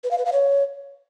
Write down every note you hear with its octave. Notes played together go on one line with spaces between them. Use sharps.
B4
F5
B4
F5
C#5